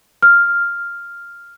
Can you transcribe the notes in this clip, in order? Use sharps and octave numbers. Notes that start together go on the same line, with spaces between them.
F6